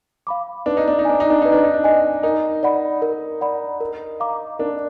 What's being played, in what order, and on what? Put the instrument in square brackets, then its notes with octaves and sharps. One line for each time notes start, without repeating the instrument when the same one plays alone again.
[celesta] F5 B5 D6
[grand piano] D4 [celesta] B4
[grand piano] D#4
D4
D#4
[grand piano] D4 [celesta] D#5 G#5
[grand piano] D#4
D4
[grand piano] D#4 [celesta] B4
[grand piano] D4
D#4
D4
[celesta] D#5 G#5
[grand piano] D#4 [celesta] A#4
[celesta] D5 F#5 B5
A#4
D5 F#5 B5
A#4
F5 A#5 D6
[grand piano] D4 [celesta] A#4